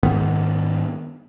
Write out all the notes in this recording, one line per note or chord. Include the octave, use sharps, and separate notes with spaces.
G#2 D#3 B3